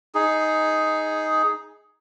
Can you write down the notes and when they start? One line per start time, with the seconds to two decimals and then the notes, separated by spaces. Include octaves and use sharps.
0.15 D#4 G#4